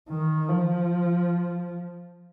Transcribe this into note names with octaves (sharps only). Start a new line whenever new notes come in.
D#3
F3